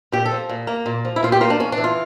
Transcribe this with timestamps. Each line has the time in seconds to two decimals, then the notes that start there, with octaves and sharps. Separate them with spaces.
0.12 A#2 G4
0.25 A4
0.31 F3
0.49 A#2
0.67 A#3
0.86 A#2
1.05 F3
1.16 E4
1.23 A#2 F4
1.32 G4
1.41 A#3 F4
1.50 D4
1.60 E2 C#4
1.72 D4
1.78 E3
1.84 F4